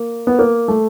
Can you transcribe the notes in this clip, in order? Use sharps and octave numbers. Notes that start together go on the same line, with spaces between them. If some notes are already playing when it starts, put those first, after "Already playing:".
Already playing: A#3
B3
A#3
A3